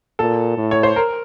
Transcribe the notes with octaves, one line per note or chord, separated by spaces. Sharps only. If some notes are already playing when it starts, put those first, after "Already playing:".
A#2 A4
A2
C#5
C5
A#4